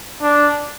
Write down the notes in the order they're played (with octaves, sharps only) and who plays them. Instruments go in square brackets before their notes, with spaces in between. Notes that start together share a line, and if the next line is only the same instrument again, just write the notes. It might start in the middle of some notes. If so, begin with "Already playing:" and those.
[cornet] D4